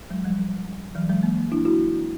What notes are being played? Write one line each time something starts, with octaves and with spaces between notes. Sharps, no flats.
F#3 G#3
F3 G3
E3 F#3
F#3 G#3
G#3 A#3
D4 E4
E4 F#4